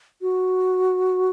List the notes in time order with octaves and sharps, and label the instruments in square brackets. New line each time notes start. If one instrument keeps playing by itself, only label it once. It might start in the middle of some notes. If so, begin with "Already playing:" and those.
[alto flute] F#4